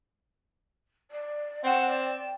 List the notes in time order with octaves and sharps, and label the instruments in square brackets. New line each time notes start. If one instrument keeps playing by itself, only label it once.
[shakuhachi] D5
[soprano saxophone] C4 [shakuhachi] F#5 [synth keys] G5 E7
[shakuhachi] D5